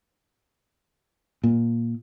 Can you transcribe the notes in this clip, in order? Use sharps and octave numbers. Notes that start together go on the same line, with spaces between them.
A#2